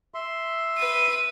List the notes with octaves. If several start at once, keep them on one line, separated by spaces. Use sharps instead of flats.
E5 C6
B4 D#7